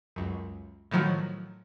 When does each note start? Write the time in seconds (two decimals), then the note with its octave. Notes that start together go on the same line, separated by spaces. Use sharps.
0.16 C#2 F#2
0.91 A2 D#3 F3 F#3